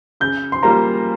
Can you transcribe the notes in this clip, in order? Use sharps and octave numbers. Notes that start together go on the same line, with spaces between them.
C#3 G6
C6
G3 A#3 F4 C5 A#5